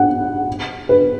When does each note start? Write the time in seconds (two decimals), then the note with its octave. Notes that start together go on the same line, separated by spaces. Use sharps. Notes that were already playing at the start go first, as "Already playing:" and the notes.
Already playing: F#5
0.89 B4